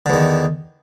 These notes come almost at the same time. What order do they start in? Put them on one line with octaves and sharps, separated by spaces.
D3 E2 D#3